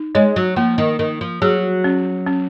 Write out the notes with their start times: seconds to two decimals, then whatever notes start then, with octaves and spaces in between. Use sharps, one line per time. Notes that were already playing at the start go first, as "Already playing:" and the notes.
Already playing: D#4
0.15 G#3 C#5
0.36 F#3
0.56 F3 A#3
0.78 D#3
0.99 D#3 A#4
1.21 F3
1.42 F#3 G#4
1.84 C#4
2.27 C#4